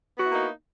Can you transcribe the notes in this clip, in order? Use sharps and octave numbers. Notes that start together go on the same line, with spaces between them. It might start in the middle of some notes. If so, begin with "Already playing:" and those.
A#3 B3 D#4 E4 F#4